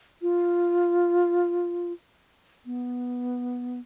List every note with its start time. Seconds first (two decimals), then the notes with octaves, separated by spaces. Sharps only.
0.22 F4
2.66 B3